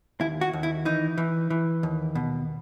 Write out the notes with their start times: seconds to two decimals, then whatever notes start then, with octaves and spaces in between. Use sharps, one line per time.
0.21 D#2 E4
0.41 F#4
0.53 D#2
0.63 E4
0.85 E3 D#4
1.18 E3
1.50 E3
1.83 D#2
2.15 B2